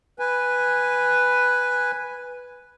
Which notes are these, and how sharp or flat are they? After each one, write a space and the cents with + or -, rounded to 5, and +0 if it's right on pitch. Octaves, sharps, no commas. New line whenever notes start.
B4 +0 G#5 -10